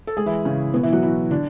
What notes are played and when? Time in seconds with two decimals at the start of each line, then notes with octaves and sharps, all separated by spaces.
0.07 A4
0.17 G#3 G#4
0.26 E3 E4
0.45 C#3 C#4
0.74 B2 B3
0.83 E3 E4
0.92 F#3 F#4
1.02 E3 E4
1.31 D3 D4